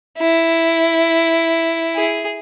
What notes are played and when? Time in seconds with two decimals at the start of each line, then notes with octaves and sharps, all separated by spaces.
0.18 E4
1.95 G#4